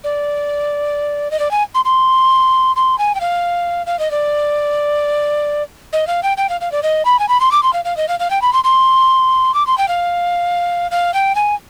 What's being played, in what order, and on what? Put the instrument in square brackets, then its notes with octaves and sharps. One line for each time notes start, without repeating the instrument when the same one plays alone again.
[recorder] D5
D#5
D5
G#5
C6
C6
C6
G#5
G5
F5
F5
D#5
D5
D#5
F5
G5
G5
F5
F5
D5
D#5
B5
G#5
B5
C6
D6
C6
F5
F5
D#5
F5
F5
G5
B5
C6
C6
D6
C6
G5
F5
F5
G5
G#5